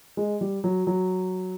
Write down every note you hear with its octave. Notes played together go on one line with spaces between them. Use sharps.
G#3
G3
F#3
F#3